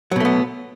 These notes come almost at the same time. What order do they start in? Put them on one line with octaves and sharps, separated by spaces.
F#3 B2 A3 B3